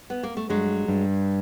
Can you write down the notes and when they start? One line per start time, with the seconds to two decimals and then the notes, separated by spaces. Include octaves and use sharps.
0.10 B3
0.23 A#3
0.37 A3
0.50 G2 F#3 G#3
0.88 G2